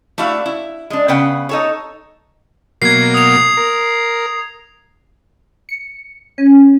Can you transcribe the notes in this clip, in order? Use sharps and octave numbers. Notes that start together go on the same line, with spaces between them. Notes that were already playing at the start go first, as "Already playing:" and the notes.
A3 D4 E4 F#4 F5
E4
G#3 D4
C#3 B3 B4 F#5 G5
D#4 A4 C#5
B2 F#3 A#3 G#6 C7
D#6 F7
A#4
C#7
C#4